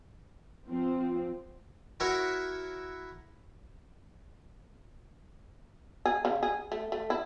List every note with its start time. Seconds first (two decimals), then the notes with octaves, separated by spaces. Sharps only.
0.68 F3 C4
2.00 E4 F#4 A#4 C#5 E5 F#5
6.06 G#4
6.25 C#3
6.43 G#4
6.72 A3
6.92 A3
7.10 E4